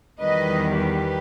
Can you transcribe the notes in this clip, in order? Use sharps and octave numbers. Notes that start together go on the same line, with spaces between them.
E2 D#3 G3 B4 D#5
G4 B4